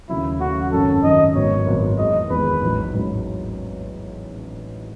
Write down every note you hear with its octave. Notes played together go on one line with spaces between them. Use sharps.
D#2 C#3 F#3 A3 E4
D#2 C#3 F#3 A3 F#4
G#1 F#2 D#3 F#3 C#4 A4
G#1 F#2 D#3 F#3 C#4 D#5
G#1 G#2 F#3 B3 C#5
G#1 G#2 F#3 B3
E2 D#3 G#3 D#5
E2 D#3 G#3 B4
A1 G#2 F#3
A1 G#2 F#3